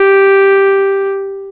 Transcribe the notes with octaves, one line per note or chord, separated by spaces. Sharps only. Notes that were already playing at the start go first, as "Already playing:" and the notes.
Already playing: G4